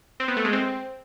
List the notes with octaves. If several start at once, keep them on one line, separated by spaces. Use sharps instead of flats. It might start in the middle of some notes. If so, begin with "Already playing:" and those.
C4
B3
A3
G#3
C4